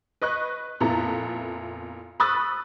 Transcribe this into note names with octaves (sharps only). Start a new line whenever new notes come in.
B4 D#5 C#6 F#6
F2 A#2 B3 E4 A4 A#5
B5 C#6 D#6 E6 F#6 A6